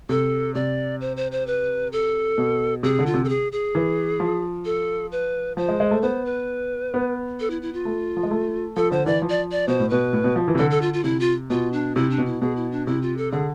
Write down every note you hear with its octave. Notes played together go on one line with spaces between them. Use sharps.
C3 A4
C3 D5
C5
C5
C5
B4
A4
B2
C3 G#4
D3
F4
C3
A4
G#4
G#4
E3
F3
A4
B4
F3 C5
G#3
G#3
A3
B3 C5
B4
B3
A4
E4
E4
F4
A3
F3
G#3
A3
F3 A4
D3 C5
E3 D5
F3
D5
D5
B2 C5
A2
B2 B4
A2
B2
F3
E3
C3
D3 A4
A4
F4
F4
C3 E4
F4
B2 F4
D4
C3 E4
D4
B2
E4
B2 G#4
E4
D4
C3 E4
F4
A4
D3 G#4